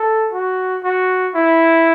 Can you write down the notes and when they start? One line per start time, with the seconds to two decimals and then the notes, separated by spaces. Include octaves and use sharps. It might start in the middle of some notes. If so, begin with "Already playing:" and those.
Already playing: A4
0.32 F#4
0.83 F#4
1.35 E4